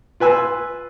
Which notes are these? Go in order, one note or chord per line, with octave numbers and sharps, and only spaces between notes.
F4 B4 G#5 E6